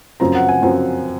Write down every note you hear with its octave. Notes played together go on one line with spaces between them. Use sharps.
F#2 F3 C4 A#5
F#5
G#5
F#2 F3 C4